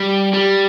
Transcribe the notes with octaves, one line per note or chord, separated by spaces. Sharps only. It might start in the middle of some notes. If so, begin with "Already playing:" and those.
Already playing: G3
G3